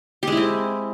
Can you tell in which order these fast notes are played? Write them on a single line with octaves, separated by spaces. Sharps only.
G4 G#3 E4 C4